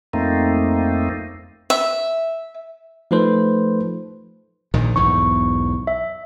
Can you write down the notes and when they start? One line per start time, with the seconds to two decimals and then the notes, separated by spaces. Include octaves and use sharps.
0.13 F2 A3 A#3 C4 D#4
1.70 E5
3.11 F3 A3 D#4 A4 B4 C5
4.74 A#1 A#2 D#3
4.96 B1 E2 G#2 C#6
5.87 E5